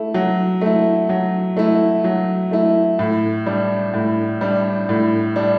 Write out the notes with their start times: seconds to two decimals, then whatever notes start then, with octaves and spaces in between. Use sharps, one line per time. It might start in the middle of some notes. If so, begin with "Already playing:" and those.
Already playing: A3 E4
0.14 F#3
0.61 A3 E4
1.09 F#3
1.57 A3 E4
2.04 F#3
2.51 A3 E4
2.99 A2
3.46 G3 D4
3.94 A2
4.41 G3 D4
4.89 A2
5.36 G3 D4